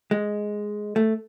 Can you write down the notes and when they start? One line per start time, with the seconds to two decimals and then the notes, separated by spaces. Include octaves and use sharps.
0.11 G#3
0.96 A3